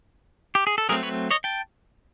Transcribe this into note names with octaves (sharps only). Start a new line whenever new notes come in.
G4
G#4
A4
F#3 A3 C4 G#4 A#4
B4 C#5
C#5 D#5
G5 A5